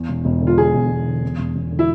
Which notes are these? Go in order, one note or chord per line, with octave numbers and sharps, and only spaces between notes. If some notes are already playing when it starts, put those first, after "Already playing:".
Already playing: E2
E1
E1
D3
F4
E2 G#4
E1
E1
D3
E2
E1
E1
D3
E4